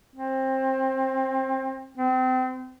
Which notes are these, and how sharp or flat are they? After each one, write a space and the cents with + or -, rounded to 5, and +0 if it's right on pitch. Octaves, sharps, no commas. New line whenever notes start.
C4 +20
C4 -30